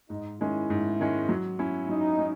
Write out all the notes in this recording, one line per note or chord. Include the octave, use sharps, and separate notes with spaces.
G#2 D#4
D#3 G#3 C#4 E4
G#2
D#3 G#3 C#4
F#3
C#4 E4
F#3 D#4
C#4